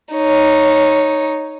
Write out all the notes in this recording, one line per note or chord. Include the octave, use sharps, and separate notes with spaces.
D#4 C#5